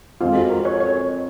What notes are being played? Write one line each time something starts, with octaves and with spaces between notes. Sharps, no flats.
F2 F3 G#3 F4
F#4
A#4
C#5
C#5